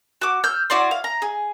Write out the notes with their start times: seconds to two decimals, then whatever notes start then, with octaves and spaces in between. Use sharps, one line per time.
0.21 F#4 D6
0.44 E6 F6 G6
0.70 E4 F#4 D5 C6
0.91 F5
1.04 A#5
1.22 G#4